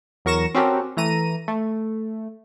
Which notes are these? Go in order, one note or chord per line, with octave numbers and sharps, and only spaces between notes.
E2 F#3 A#4 C#6 A#6 E7
C4 C#4 F#4 G4 A4 A#4
E3 A3 A#5 D#7
A3